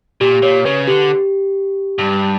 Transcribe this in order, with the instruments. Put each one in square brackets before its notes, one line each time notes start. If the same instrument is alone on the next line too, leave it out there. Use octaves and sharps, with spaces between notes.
[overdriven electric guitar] A#2 [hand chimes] G4
[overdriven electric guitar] A#2 [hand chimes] C#5
[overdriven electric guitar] C#3 [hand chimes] B4
[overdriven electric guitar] D3 [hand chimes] G4
[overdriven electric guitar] G2